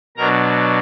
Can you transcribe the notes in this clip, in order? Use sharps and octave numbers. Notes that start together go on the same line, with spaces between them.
B2 F#3 D4 A#4 A#5